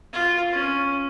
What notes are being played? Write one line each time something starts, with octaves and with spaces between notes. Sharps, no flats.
F4
C#4